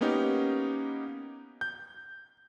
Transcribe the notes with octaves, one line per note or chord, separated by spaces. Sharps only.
A#3 B3 C#4 D#4 G4
G6